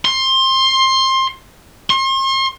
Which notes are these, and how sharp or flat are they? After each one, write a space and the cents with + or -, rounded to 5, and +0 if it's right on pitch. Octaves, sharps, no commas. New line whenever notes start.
C6 +20
C6 +40